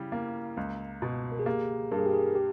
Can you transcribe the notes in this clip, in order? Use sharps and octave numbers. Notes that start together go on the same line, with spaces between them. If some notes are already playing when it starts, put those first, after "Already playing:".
Already playing: C#3 G3 E4
A#3
C#2
B2
A#4
G#4
A#3 G4
G2 A#4
G#4
G4
G#4
G4